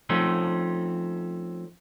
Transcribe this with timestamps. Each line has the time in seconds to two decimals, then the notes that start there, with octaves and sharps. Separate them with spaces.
0.09 F3 A3 C4 C#4 D#4